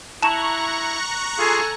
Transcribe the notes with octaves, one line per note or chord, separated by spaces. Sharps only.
E4 A5 A#5 C#6 F#6 E7
F4 G#4 A4 F5 G#5